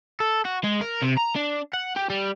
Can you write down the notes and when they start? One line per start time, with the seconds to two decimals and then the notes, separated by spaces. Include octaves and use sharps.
0.20 A4
0.45 F#4
0.64 G#3
0.81 A#4
1.02 C3
1.18 A#5
1.36 D4
1.74 F#5
1.96 G4
2.10 G3